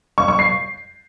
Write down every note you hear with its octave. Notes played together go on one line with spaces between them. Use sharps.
C#6
C#6
C7